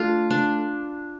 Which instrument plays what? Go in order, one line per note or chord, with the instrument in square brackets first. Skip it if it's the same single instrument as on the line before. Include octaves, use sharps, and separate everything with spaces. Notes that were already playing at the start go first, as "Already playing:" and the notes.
Already playing: [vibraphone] A3 A4 [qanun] D4 F4
[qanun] D4